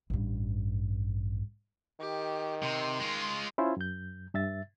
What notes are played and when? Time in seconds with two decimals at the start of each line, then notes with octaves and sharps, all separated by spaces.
0.10 A1 G2
2.01 D#3 G4
2.63 C3 C6
3.00 G#3 F4
3.58 C#4 E4 F4 C5
3.77 F#2 G6
4.34 G2 E5 A6